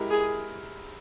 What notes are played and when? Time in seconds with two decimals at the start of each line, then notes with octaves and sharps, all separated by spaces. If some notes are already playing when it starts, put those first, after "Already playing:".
Already playing: G#3 E4 G4 A#4
0.11 G#4